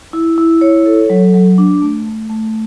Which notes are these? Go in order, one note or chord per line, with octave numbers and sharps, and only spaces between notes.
E4
E4
C#5
A4
F#3
F#3
D4
A3
A3
A3